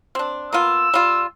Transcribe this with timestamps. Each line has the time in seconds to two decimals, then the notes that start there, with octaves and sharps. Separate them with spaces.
0.15 C4 D4
0.53 A#3 B3 F4 E6
0.94 G3 F4